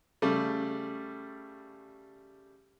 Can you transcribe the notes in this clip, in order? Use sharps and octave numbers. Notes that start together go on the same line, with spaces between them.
C#3 G3 A3